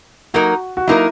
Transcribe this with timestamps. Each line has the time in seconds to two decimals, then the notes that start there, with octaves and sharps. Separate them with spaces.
0.34 F#3 A#3 D#4 F#4 A#4
0.77 F#4
0.87 F#3 A#3 D#4 E4 A#4